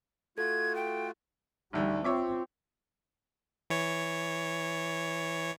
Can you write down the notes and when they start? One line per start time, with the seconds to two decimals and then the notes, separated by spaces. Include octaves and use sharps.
0.38 A3 F4 F#4 A4 G#6
0.76 G5
1.73 A1 D2 G3 D#4
2.04 C4 F4 C#5 E5 D6
3.70 E3 C#5